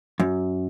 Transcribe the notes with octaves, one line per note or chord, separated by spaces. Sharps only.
F#2